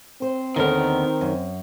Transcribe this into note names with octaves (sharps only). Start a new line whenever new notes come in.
C4 C5
D#2 D3 D#3 B3 A#4
F#2